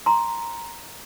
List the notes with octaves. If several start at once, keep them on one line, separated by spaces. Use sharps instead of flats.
A#5 C6